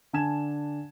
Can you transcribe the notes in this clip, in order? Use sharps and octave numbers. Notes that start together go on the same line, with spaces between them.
D3 D4 G#5 A5 G#6 E7